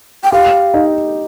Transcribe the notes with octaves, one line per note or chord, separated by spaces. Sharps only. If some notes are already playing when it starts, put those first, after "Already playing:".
G5
G4 F5
D#4